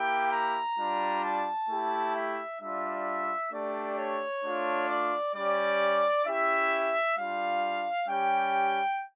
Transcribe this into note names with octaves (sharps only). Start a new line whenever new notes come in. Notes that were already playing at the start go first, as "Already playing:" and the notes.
Already playing: A#3 E4 G4 G5
A#5
G3 D4 F4
A5
A3 E4 G4
E5
G3 D4 F4 E5
A3 D4 G4 D5
C#5
A3 D4 F4
D5
G3 C#4 G4 D5
C#4 E4 G4 E5
G3 D4 F4 F5
G3 C#4 G4 G5